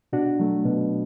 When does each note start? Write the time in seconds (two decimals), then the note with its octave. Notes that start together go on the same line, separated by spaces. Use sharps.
0.13 B2 D4 F#4
0.39 F#3 A3
0.65 B2